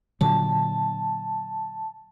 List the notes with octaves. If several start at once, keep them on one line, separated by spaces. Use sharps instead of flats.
A#2 D3 F#3 A5